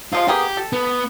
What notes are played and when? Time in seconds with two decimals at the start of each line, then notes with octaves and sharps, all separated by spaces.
0.13 C3 F3 G#3 F4
0.28 A#3 B3 G4 G#4
0.57 A4
0.73 B3